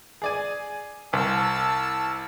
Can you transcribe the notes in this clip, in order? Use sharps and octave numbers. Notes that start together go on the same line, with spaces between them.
G#4 D5 G#5
C2 A5 E6